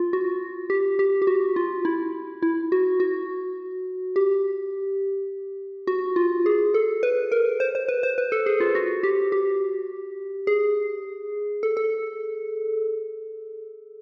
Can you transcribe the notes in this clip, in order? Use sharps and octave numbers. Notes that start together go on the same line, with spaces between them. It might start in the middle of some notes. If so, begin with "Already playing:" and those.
Already playing: F4
F#4
G4
G4
G4
F#4
F4
E4
E4
F#4
F#4
G4
F#4
F4
G#4
A4
B4
A#4
C5
C5
B4
C5
B4
A4
G#4
F4
F#4
G4
G4
G#4
A4
A4